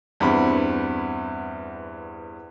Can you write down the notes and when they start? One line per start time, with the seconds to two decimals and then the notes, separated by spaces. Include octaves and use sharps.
0.20 E2 G2 C4 F#5 B5